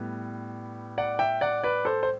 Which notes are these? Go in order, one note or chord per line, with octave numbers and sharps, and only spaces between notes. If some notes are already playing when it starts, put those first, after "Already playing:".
Already playing: A2 G3 B3
D5 F#5
E5 G5
D5 F#5
B4 D5
A4 C5
C5